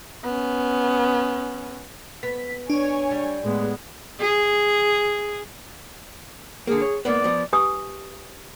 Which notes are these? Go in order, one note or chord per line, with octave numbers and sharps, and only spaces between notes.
B3 C#4
B3 B6
D4 C#5 G#5
G3
A2 G#3 B3
G#4
D3 A#3 G#4
C#5
G#2 A#3 B3 D5
F3 B3
G4 B4 G#5 C#6 D#6